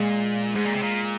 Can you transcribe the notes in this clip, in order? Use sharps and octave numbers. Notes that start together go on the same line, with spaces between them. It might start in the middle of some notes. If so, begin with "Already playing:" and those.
Already playing: A#2 G#3
G#2 G#3
A#2
C3
A#2